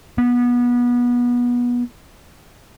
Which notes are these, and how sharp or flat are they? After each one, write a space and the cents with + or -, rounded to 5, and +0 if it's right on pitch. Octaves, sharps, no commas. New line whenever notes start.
B3 -25